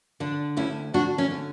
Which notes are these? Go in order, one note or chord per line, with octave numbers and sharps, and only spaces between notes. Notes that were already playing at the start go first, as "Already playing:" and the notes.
D3 D4
D2 C#4 E4
D2 D4 F#4
C#4 E4
D3